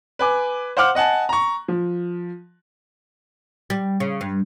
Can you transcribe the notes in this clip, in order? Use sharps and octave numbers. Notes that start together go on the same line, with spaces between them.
B4 G#5 D6
C5 F5 F#5 D6 F6
D#5 F#5 G#5 A5
A#5 C#6
F3
G3
C#3
G2